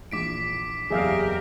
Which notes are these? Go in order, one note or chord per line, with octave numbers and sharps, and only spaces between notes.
A#1 E3 D6 B6 D7
F#1 E2 G4 G#4 A#4 E5 F5